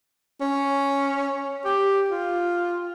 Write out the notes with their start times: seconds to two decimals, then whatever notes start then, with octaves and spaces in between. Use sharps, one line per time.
0.41 C#4
1.65 G4
2.10 F4